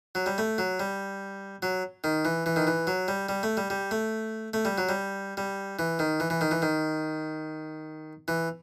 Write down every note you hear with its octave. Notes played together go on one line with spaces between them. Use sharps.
F#3
G3
A3
F#3
G3
F#3
D#3
E3
E3
D#3
E3
F#3
G3
G3
A3
G3
G3
A3
A3
G3
F#3
G3
G3
E3
D#3
E3
E3
D#3
E3
D#3
E3